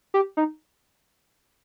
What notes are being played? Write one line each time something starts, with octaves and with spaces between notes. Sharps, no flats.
G4
D#4